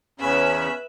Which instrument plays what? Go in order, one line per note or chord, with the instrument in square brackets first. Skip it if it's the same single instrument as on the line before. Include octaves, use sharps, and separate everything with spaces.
[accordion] E2 C#3 C#4 [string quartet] B4 E5 B5